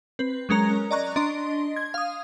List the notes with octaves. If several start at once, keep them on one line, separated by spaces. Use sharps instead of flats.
C4 B4
F#3 G#3 C#4 A#4 A#5
D5 D#5 A#5 C#6 F#6
D4 D#5 C6
G#6
F5 D#6